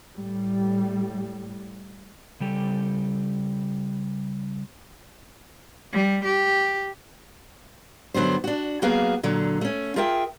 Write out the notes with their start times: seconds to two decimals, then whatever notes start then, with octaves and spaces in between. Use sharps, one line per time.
0.15 A2 G3
2.40 C#3 G3 G4 A4
5.93 G3
6.25 G4
8.14 G2 D3 F#3 B3 C5
8.44 D4 F#4
8.82 F#3 A#3 B3 F#4 G#4 F5
9.23 A#2 D3 F#3
9.61 A3 C#4
9.96 F4 G#4 A#4 E5 G5